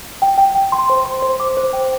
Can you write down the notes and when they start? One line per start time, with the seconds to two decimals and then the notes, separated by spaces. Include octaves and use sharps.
0.22 G5
0.38 G5
0.55 G5
0.72 C6
0.90 C5
1.05 C6
1.22 C5
1.40 D6
1.57 C5
1.73 G5